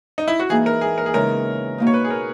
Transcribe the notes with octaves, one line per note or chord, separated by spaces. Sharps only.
D#4
E4
F#4
G#2 E3 A#3 D#4 G#4
A#4
G#4
A#4
G#4
E2 C#3 G#3 D#4 A#4
B2 A#3 D#4
C#5
B4
G#4
A#4